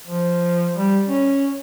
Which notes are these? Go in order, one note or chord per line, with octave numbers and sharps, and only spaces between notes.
F3
G3
C#4